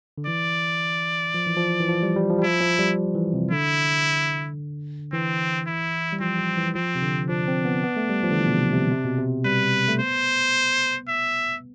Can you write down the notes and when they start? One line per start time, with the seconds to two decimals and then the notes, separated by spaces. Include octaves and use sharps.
0.18 D3
0.27 E3 D5
1.34 F3
1.47 E3
1.57 F3
1.80 E3
1.89 F3
2.03 G3
2.16 G3
2.30 F3
2.38 G3
2.43 F3 E4
2.61 F3
2.79 G3
3.15 E3
3.34 C3
3.51 D3 E4
5.13 E3 C4
5.67 E4
6.13 G3
6.21 F3 C4
6.39 F3
6.58 E3
6.75 F3 C4
6.95 C3
7.02 D3
7.29 F3 D4
7.48 C4
7.65 B3
7.83 B3
7.97 A3
8.10 G3
8.23 F3
8.31 D3
8.37 E3
8.47 B2
8.55 C3
8.73 C3
8.91 C3
9.04 B2
9.18 C3
9.45 G3 B4
9.88 A3
10.00 B3 C5
11.08 E5